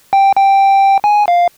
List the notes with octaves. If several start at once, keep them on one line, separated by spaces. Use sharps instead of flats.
G5
G5
G#5
F5